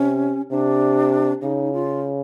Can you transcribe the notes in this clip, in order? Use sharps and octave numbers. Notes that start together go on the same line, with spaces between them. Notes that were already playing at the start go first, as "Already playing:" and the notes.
Already playing: C3 C#4
C3 D4
C#3 D#4
F4